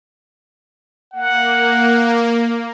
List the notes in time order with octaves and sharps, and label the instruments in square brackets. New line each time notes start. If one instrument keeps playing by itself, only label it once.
[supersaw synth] A#3 [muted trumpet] F#5